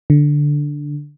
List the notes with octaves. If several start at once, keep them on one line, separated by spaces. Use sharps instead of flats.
D3